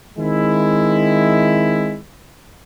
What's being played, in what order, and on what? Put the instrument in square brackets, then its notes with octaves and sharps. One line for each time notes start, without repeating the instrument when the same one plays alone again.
[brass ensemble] D#3 G#3 C4 E4